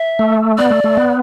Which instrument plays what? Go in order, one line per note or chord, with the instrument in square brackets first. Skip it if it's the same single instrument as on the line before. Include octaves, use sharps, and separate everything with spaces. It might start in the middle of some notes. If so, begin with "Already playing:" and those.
Already playing: [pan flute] E5
[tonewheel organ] A3
[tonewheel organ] B3 [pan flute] D5
[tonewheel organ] A3
A3
B3